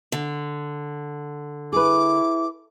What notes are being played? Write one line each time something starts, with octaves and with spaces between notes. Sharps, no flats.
D3
E4 G#4 B4 D6